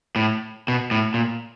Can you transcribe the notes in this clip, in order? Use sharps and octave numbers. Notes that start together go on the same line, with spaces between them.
A2
B2
A2
A#2